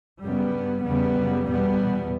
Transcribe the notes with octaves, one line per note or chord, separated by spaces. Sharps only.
F#2 C#3 G3 B3
G2
E2 C#3 G3 B3
F#2 C#3
E2 B2 G3 B3
E2 B2